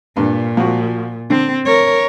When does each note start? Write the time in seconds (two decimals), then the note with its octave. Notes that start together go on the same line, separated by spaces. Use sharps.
0.17 G2 A#2
0.57 F3 F#4
1.30 D3 C4
1.65 A#4 C#5